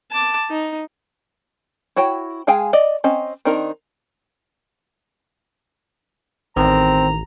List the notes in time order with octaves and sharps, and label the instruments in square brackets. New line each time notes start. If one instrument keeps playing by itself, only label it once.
[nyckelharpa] A5 D6
D#4
[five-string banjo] E4 F#4 C#5 G5
G#3 G#4 F5 G5 G#5
D5 D#5
C4 C#4 D#5
D#3 C4 D4 D#4 A#4
[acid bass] A1 [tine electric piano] D#3 [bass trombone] C4 [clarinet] A#5